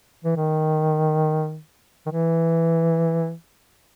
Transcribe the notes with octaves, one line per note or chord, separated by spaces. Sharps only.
E3
D#3
D#3
E3